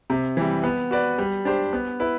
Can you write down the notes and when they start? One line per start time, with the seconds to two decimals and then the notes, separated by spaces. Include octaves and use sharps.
0.10 C3
0.37 E3 G3
0.64 B3
0.91 F#4 B4 D5
1.18 G3
1.45 D4 G4 C5
1.73 B3
2.00 E4 B4